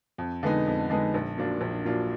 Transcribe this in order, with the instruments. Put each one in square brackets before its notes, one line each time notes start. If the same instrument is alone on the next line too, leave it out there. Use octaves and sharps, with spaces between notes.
[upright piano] F2
D3 G#3 B3 D#4
F2
D3 G#3 B3 D#4
A#1
A#2 F#3 D4 F4
A#1
A#2 F#3 D4 F4